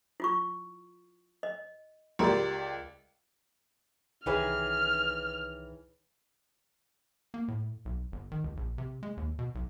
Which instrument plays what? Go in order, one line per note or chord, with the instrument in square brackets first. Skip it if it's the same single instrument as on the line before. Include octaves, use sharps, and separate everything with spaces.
[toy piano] E4 F4 C#6
D#5
[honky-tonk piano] C#2 G4 D5 [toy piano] A#4 A#5 C6
[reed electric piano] C2 B4 C#5 [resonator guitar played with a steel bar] D#3 E3 G#4 [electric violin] F6
[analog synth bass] A#3
A2
B1
G1
D#3
C#2
A#1
C3
G#3
D#2
B2
B1